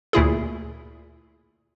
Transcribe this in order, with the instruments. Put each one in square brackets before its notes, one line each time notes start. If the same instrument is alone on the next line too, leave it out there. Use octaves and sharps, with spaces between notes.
[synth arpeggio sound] D2 A#2 E4 G#4